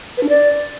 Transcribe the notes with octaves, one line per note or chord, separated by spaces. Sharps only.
B4
D4
D5